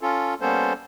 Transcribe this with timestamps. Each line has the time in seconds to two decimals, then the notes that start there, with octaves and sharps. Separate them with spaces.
0.01 C#4 F4 A4
0.41 G3 A#3 B3 C#4 A4 C5